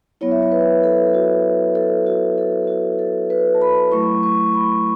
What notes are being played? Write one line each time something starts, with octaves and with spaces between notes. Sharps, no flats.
F#3 B3 E4 C#5
E5
C#5
B4
A4
F#4
A4
F#4
A4
F#4
A4
B4
A5
B5
F#3 A3 E4 C#6
C#6
B5